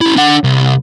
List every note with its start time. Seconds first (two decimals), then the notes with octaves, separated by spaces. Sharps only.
0.01 C#4 E4
0.16 D4 F#5
0.44 C2